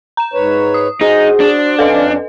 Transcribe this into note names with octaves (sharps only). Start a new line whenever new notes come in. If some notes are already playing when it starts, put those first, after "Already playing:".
A#5 E7
G#2 B4 C#5
D#6
D#4 F#4 G#4 C5
D4
F2 C#4 A4 B4 D#5 F5